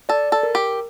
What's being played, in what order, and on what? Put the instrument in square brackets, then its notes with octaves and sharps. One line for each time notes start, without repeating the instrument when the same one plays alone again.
[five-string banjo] A4 [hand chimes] D5
[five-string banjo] A4
[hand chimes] A#4
[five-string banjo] G4